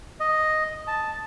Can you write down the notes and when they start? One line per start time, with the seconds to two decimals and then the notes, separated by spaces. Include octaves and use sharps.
0.20 D#5
0.88 A5